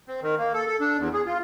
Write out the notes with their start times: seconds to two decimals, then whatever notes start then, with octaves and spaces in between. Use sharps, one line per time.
0.08 C4
0.23 D#3
0.38 A#3
0.54 A4
0.67 A4
0.80 D4
0.98 E2
1.14 G#4
1.26 F4